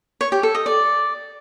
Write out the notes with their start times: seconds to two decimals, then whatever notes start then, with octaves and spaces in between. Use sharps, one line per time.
0.21 C#5
0.32 G4
0.43 A4
0.55 D#5
0.66 D5